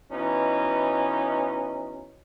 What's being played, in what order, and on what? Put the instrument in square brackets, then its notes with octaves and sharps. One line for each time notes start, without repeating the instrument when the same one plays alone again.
[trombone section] B2 E3 C#4 D#4